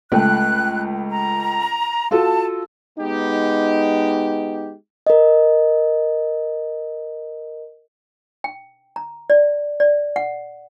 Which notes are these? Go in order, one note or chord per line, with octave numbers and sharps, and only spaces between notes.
C#2 A3 G5 F#6
A#5
F4 F#4 A4 A5
G#3 B3 D#4 G4
A#4 D#5
G5
A#5
D5
D5
F#5